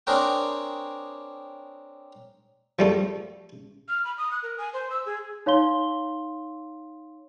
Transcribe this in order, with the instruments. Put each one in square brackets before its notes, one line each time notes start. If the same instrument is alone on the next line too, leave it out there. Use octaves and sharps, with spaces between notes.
[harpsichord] C4 D4 G#4 A#4 C#5 G5
F3 G3 A3
[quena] F6
B5
D#6
F#6
A#4
G#5
C5
E6
G#4
[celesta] D#4 C#5 F5 C6 G7